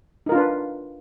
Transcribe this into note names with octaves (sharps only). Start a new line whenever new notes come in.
D4 D#4 F4 A#4 B4